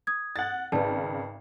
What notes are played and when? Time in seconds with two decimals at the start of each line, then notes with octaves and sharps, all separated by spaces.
0.07 D#6 G#6
0.36 F#5 A6
0.72 G#1 C#3 B4 D5 A5